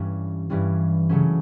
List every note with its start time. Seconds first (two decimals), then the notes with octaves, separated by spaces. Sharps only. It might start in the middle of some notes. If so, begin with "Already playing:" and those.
Already playing: G2 E3 G3 A3 C#4
0.50 G2 E3 G3 C#4
1.09 C#3 F#3 A3 C#4